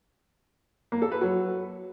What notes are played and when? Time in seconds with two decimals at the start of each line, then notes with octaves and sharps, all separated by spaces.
0.92 A#3
1.02 A4
1.11 B4
1.21 F#3